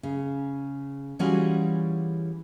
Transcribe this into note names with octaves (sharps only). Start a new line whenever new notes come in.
C#3
E3 G3 C#4 F4 F#4 G#4